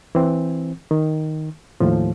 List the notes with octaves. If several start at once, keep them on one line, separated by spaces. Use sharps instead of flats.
E3 C4
D#3
D#2 A2 F3